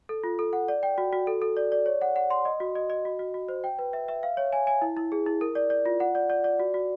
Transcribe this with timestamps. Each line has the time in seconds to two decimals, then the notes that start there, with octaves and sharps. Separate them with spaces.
0.09 A4
0.24 F4
0.39 A4
0.53 F#5
0.68 D5
0.83 G5
0.98 F#4
1.13 F#4
1.27 A4
1.42 A4
1.57 D5
1.72 D5
1.86 C#5
2.01 F#5
2.16 F#5
2.31 C6
2.45 D#5
2.60 F#4
2.75 D#5
2.90 D#5
3.05 F#4
3.19 F#4
3.34 F#4
3.49 C5
3.64 G5
3.79 B4
3.93 E5
4.08 E5
4.23 F5
4.37 C#5
4.53 G#5
4.67 G#5
4.82 E4
4.97 E4
5.12 G#4
5.26 E4
5.41 A#4
5.55 D5
5.70 D5
5.86 F4
6.00 F#5
6.15 D5
6.30 D5
6.44 D5
6.60 F#4
6.74 F#4